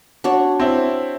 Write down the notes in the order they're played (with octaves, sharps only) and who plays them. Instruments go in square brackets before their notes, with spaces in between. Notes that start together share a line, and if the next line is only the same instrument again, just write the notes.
[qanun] D4 F#4 C#5
[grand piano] C4 E4